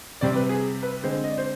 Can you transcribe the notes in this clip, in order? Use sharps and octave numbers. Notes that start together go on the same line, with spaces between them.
C3 G3 C4 D5
B4
G#4
B4
D3 G#3 C4 C5
D#5
D5
C5